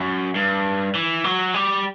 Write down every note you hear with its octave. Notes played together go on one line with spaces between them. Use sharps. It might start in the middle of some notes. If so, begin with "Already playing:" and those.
Already playing: F#2
G2
E3
F#3
G3